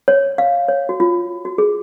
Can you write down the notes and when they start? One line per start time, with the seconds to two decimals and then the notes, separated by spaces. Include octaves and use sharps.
0.08 C#5
0.38 F5
0.68 C#5
0.89 F#4
1.00 F4
1.45 F#4
1.58 G#4